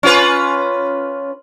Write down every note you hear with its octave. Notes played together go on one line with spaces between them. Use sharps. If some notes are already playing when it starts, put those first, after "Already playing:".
C#4 F4 B4